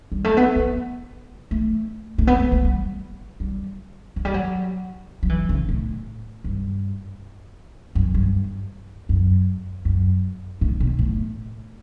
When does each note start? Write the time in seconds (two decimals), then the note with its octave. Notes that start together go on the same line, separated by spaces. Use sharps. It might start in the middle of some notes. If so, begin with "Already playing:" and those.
0.12 G3
0.24 A3
0.37 B3
0.56 B3
1.51 A3
2.18 A3
2.27 B3
2.40 A3
2.52 A3
2.64 G3
3.40 G3
4.16 F#3
4.25 G3
4.34 F#3
5.23 F#3
5.29 E3
5.49 C#3
5.69 A2
6.44 G2
7.95 F#2
8.14 G2
9.09 F#2
9.85 F#2
10.61 A2
10.80 B2
10.99 A2